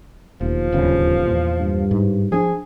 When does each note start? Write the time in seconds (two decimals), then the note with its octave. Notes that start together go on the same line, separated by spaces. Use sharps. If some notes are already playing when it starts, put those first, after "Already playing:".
0.41 E1 D#2 F3
0.73 D1 G1 D#2 C#3
1.27 E2 A#2
1.59 G2
1.91 G#2
2.32 F3 C#4 D4 G#4